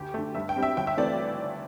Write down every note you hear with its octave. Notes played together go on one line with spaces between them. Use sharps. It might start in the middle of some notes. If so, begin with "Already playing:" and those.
Already playing: D2 G4
D3 A3
G2 E5
G5
G3 C4
E5
G1 G5
E5
E3 A3 C4 D5